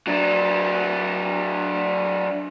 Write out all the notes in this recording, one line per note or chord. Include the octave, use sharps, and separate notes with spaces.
F#3 D4